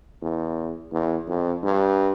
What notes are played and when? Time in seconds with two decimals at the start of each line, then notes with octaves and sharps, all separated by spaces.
0.22 E2
0.92 E2
1.28 F2
1.63 G2